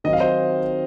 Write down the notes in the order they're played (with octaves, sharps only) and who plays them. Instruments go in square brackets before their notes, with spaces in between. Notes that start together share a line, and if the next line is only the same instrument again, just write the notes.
[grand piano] D#3 F#3 C4 D#4 D#5
F5
C5 D#5